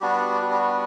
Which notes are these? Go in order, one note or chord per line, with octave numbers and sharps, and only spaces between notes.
G3 B3 D4 F#4 G4
G4
F#4
G4
F#4